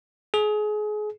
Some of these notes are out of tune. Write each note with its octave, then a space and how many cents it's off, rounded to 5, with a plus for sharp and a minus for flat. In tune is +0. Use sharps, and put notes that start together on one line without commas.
G#4 +30